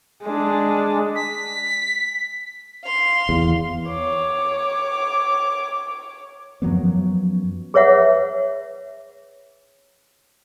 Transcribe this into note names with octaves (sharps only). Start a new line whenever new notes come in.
G#3 D4
B6
F5 C6
E2
C#5 D6
F#2 F3 F#3 B3
G#4 B4 C#5 E5 F#5